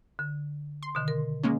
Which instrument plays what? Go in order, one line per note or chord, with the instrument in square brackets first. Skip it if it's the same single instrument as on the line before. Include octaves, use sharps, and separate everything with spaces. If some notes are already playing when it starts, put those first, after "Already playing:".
[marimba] D3
[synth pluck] C6
[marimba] B2 D3 D#3
A#4
[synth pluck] G#3 A#3 C#4